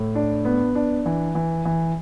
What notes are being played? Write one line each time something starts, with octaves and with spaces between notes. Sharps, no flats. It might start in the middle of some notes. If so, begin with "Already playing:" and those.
Already playing: A2
D4
B3
D4
E3
E3
E3